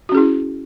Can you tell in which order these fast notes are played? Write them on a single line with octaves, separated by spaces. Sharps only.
F#4 C#4 G#4 E4